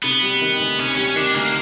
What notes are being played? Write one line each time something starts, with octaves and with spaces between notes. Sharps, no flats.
C3 B3
G3
D#3
D2
C3 C#4
G3 C#4
D#3 D4
D2 A#3